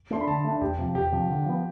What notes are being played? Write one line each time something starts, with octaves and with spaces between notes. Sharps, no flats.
A3 D4 C6
B5
D3 A5
A3 D4
E2 G4
C3 F3
E2 G4
C3 F3
D3
F3 B3